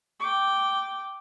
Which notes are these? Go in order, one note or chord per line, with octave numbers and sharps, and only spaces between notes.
G5 D6